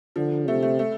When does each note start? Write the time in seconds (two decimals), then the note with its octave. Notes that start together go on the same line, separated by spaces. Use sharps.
0.16 D3 F3
0.47 C3 A3
0.62 A3
0.79 A3